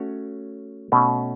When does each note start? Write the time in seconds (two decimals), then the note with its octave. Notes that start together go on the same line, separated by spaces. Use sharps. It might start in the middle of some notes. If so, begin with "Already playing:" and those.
Already playing: A3 C#4 F#4 C#5
0.92 B2 A3 C#4